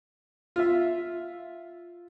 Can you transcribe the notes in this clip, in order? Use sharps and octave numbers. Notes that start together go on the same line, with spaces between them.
F4 E5